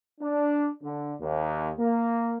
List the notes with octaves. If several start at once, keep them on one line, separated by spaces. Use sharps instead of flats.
D4
D3
D#2
A#3